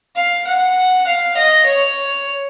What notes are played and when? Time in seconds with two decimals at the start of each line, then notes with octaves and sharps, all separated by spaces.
0.16 F5
0.47 F#5
1.07 F5
1.37 D#5
1.66 C#5